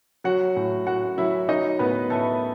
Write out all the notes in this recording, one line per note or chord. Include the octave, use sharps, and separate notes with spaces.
F#3 F#4 F#5
A2
A2 F#4 F#5
F#3 E4 E5
F#3 D#4 D#5
A2 B3 B4
A2 A3 A4